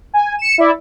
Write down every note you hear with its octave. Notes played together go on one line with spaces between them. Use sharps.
G#5
C#7 E7
E4 D5 E5